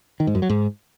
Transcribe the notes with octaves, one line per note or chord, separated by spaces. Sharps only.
D#3
G#2
F#2
F#3
G#2